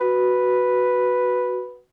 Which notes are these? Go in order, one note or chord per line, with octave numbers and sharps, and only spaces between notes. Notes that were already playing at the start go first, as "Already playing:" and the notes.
F#4 B4